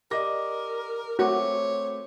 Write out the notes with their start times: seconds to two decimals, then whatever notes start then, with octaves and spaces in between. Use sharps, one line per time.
0.11 G4 A#4 D5 D#5 D6 A#6
1.19 A3 C4 F#4 A#4 C#5 D6